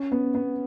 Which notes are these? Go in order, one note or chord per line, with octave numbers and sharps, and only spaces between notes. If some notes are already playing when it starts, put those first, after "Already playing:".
Already playing: C#4
B3
B3